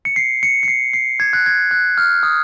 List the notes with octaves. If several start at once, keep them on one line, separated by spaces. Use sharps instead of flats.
C#7
C7
C#7
C#7
C7
C7
G#6
F#6
G#6
F#6
F6
D#6